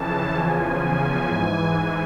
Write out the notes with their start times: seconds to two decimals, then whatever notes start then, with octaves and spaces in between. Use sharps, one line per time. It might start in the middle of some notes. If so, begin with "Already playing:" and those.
Already playing: F2 C#3 E3 A5
0.35 E2 C#3 F3 G#5
1.29 G#2 E3